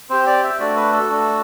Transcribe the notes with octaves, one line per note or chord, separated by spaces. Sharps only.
C4 G4 C5
D5
E5
A3 D4 F#4 D5
B4
A4
A3 D4 F#4